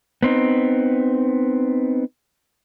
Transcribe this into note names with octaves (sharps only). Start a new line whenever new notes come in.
B3 C4 D#4